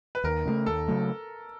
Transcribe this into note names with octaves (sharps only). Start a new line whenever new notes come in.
B4
D#2 A#4
C#3 F#3 A3
D#2 A4
C#3 F#3 A3